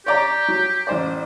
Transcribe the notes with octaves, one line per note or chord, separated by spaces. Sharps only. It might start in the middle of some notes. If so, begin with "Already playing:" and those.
G4 C#5 D5 A#5
F#3
A1 C5 D5